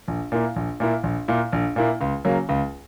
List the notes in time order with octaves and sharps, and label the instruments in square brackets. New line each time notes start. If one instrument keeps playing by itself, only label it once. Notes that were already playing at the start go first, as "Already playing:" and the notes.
[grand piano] A#1
A#2 A#3 E4
A#1
A#2 A#3 E4
A#1
A#2 A#3 E4
A#1
A#2 A#3 E4
C#2
C#3 F#3 A#3
C#2